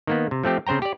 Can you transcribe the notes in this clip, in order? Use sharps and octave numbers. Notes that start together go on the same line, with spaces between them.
D#3 A#3 B3
C3
F3 A3 C4 G4
C#3 C4 C5 G5 A#5
G4 D5